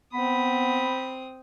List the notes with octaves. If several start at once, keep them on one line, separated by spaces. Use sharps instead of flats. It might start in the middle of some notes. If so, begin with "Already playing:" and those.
B3 C4 B5 D#6